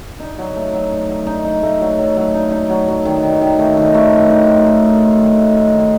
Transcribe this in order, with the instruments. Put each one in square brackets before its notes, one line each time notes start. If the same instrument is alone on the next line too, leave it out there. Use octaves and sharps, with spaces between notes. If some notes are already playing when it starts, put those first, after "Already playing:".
[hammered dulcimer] D#4
F#3
A3
F#3
D#4
F#3
D#4
D#4
A3
F#3
F#3
F#3
D#4
D#4
F#3
F#3
D#3
D#3
D#3
A3
D#3
A3
D#3
D#4
A3
A3
D#4
A3
D#3
A3
D#4
D#3